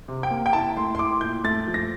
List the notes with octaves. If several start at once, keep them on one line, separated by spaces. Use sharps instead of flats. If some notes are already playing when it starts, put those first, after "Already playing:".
C3
G5
A#3
G5
E4 A5
A3 C6
C6
E4 D6
A#2 G6
A3 A6
F3
A#6